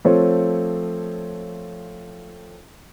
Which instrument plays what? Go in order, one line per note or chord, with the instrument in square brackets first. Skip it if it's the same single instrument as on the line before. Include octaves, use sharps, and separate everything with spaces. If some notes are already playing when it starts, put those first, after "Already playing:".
[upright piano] F3 A3 C4 C5 C#5